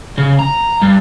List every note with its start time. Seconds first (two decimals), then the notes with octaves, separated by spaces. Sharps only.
0.18 C#3
0.39 A#5
0.82 G2